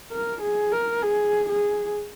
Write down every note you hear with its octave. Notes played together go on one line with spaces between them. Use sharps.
A#4
G#4
A#4
G#4
G#4